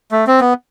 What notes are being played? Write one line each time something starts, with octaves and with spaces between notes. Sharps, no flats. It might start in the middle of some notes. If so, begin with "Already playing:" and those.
A3
C4
B3